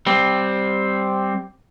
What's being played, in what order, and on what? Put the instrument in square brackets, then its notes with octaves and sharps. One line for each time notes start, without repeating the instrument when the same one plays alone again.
[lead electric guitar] G3 C4